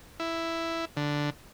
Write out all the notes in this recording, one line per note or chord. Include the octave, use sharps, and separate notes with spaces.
E4
D3